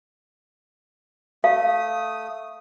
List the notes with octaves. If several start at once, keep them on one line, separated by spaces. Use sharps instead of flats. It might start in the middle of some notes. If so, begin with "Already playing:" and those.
A3 F5 D#6